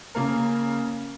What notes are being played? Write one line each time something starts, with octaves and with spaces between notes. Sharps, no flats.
C#3 A#3 A#4